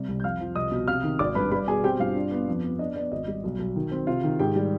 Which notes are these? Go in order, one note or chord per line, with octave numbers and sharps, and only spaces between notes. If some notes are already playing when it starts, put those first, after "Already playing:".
Already playing: C3 G3
C2
G6
F2 F5 F6
F3
C2 D#5 D#6
B2
C3 F5 F6
D#3
G#1 D5 D6
G2 B4 B5
G3 B4 B5
B2 G#4 G#5
C4 G4 G5
G2 F4 F5
D4
B3
F2
B3
D4 D#5
B3 D5
G#1 D#5
G3
B1
B1
D#3
C4
C3 F4 F5
D#3
G#2 G4 G5
G3